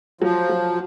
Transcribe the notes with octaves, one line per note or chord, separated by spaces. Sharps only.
F3 F#3
F#3